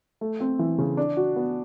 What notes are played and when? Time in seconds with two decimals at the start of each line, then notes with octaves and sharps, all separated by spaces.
0.21 A3
0.40 C4
0.59 E3
0.78 C#3
0.97 D4
1.17 F#4
1.36 B3